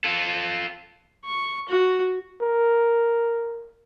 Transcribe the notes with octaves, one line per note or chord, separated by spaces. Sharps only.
F4 A4
C#6
F#4
A#4